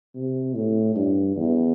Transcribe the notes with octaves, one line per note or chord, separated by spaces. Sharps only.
C3
A2
G2
E2